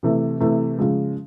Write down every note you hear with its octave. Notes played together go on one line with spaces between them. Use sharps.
C3 E3 A3
C3 E3 A3
C#3 F3 G#3